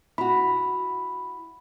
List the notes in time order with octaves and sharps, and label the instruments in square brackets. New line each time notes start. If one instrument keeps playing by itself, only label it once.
[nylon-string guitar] E4 F#4 [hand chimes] B5